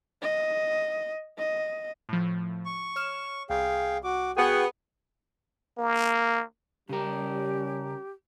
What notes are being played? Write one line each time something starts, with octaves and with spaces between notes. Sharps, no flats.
D#5
D#5
A2 F3
C#6
C#5 F6 E7
C2 G#4 F5 G5
F#4 D6
B3 F#4 G#4 G5
A#3
C#3 G3 C#4 G4 A#4